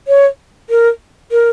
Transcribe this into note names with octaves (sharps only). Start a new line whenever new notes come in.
C#5
A#4
A#4